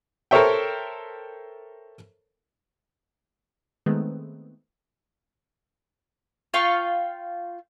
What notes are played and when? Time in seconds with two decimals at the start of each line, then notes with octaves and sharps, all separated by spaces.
0.31 A4 A#4 C5 C#5 E5 G5
3.86 D#3 G#3 A3 B3 C4
6.54 F4 F5 G5 C#6